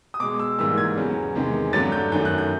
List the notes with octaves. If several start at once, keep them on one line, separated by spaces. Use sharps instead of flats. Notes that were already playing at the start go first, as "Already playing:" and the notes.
D#6
B2 G#3 D6
E6
G#2 E3 G3 A#3 E6
G#6
E2 C#3 F#3
E2 C3 D#3 G#3
G2 D3 F#3 A3 A6
G6
F#2 D#3 F#3 A3 G6
F#6
G6